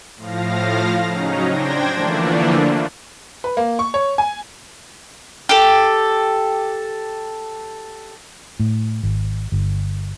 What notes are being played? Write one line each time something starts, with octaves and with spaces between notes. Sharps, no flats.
A2 F3 F5 A#6
C#3 F#3 C#4 D#4 A#5
D4 C5 G5 G#6 A#6
D3 E3 F3 A3 A#3 D4
B4
A#3
C#6
C#5
G#5
G4 A4
A2
G#1
G1